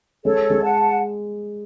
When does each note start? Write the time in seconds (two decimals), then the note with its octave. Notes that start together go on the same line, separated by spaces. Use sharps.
0.24 G#3 A4 C#5
0.50 G#3
0.62 F#5 A5